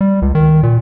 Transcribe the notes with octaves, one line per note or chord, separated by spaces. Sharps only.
G3
C#2
D#3
A#2